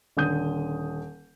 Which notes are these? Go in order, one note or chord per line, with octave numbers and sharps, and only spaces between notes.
D#1 D3 D#6 G6 D#7